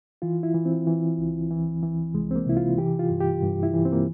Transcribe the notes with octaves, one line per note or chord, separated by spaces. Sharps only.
E3 F4
E4
E3
C4
E3
C#2
E3
E3
C2 G#3
C4
A#3
C3 E4
F4
E3 G4
F4
G2
G4
G2
E4
E3
C4
A#3